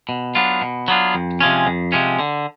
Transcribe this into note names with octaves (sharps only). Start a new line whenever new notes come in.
B2
F#3 B3 D4 F4
B2
F#3 B3 D4 F4
F2
C3 F3 G#3 C#4
F2
C3 F3 G#3 C#4
D3